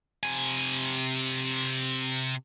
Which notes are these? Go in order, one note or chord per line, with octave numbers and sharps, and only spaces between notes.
C3 G#5